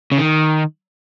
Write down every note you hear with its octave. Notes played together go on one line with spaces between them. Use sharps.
C#3
D#3